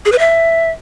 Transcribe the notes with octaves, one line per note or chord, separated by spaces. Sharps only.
G#4
B4
E5